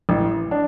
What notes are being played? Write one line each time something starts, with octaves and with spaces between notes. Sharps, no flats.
A1
D4